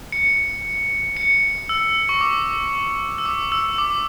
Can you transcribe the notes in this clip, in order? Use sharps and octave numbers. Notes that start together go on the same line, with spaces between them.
C#7
C#7
E6
C#6
D6
E6
D6
E6
D6